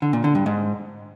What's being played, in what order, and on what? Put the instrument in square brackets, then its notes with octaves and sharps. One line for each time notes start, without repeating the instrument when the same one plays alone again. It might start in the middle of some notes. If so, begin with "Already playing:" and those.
[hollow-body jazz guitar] D3
A#2
D3
G2
G#2